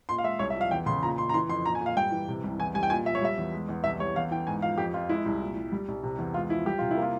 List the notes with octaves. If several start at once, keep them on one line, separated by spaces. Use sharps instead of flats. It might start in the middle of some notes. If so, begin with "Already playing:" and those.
A#2 C6
F5
G#3 E5
C2 C#5
E5
F3 F5
E2 G5
C#3 C6
A#2 A#5
A#2 C6
A#5
E3 C6
F2 C6
A#2 A#5
G#5
A#2
F5
G2 G5
E3
C3
C2
E2 G#5
G3 G#5
G5
A#2 G#5
F3 E5
C#5
G3 E5
E2
G#3
E2
C2 E5
G3 C#5
E2 F5
E3 G5
G#2 G#5
F3 F5
F2 G4
F2 F4
G#3 E4
C2
A#2
G3
G3
C2
C3
E2
G#3 F4
F3 E4
G3 G4
C3 F4
E4
A#3
F4